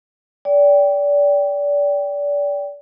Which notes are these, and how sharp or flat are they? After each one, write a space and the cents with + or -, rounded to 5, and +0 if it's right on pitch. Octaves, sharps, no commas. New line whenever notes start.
D5 -30 G5 +0